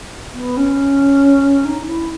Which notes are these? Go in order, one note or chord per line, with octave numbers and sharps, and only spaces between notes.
B3
C#4
D#4
D#4
E4